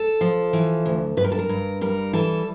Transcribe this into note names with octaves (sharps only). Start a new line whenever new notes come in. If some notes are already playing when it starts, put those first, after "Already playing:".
Already playing: A4
F3
E3
D2
G2 B4
A#4
A4
A#4
G2
G3 A#4
E3 A4